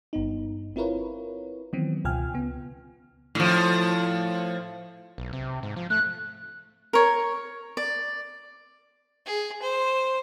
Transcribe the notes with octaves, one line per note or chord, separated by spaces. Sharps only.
G1 G2 B3 D#4
C4 E4 F4 A#4 B4 C#5
D#3 E3 F#3 B3 C4
C#2 B2 F4 G5 G#5 F6
C#3 B3
A2 F3
B1
C3
G#2
F3
A3 F#6
A#4 C#5
D5
G#4
C5